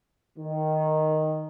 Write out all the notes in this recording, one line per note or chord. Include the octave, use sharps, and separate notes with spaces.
D#3